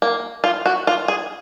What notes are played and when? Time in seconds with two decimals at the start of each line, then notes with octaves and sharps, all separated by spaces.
0.02 A#3
0.44 F4
0.66 F#4
0.87 F4
1.08 G#4